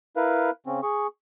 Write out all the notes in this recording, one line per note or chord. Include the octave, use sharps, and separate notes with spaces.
E4 A#4 B4 F5
C#3 C4 C#4
G#4 C#6